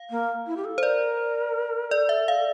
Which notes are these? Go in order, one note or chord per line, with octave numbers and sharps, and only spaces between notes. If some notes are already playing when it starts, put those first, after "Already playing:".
Already playing: F5
A#3
E4
G4
A4
C5
A#4 D5
A4 D5
E5
F5